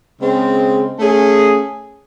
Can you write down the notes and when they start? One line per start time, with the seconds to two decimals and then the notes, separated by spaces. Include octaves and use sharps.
0.20 C#3 G#3 C4
1.00 A3 C#4 G#4